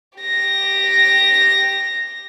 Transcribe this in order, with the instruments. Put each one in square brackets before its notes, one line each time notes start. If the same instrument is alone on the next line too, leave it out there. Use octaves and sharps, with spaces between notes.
[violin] G4 A#6